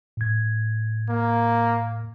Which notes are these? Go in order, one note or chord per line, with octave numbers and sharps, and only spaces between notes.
A2 G#6
A#3